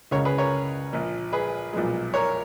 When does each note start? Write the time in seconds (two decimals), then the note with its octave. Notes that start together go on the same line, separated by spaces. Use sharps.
0.11 C#2 C#3 G#3 A#4 C#5
0.25 G#4 B4
0.38 A#4 C#5
0.93 A#1 A#2 F3
1.33 G#4 B4
1.73 B1 A#2 F3 G#3
2.14 A#4 C#5